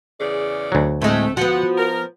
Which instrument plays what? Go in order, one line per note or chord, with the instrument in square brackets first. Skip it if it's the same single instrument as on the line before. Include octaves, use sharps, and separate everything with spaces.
[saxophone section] E2 C#3 D5 [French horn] G#4
[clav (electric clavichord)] D2 F#3
[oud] A2 G#3 [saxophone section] A3 [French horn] C4
[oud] F3 B3 [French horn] F#4 [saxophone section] F#5
[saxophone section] A#4